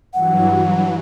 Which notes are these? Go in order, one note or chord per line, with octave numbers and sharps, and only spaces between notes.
G2 E3 F#3 F#5